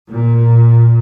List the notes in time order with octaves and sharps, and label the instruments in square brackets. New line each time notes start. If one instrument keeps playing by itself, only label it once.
[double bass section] A#2